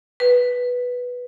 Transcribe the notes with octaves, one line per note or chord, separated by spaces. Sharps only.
B4